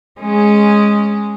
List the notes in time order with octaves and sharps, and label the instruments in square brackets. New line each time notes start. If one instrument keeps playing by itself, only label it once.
[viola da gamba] G#3 C#4 G#4